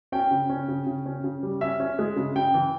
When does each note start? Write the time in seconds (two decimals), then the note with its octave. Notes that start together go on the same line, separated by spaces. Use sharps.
0.12 C#4 G5
0.31 C#3
0.50 C#4
0.68 C#3
0.87 C#3
1.06 C#4
1.24 C#3
1.43 G3
1.61 C#4 E5
1.80 C#4
1.99 G#3
2.16 C#3
2.36 C#3 G5
2.54 E3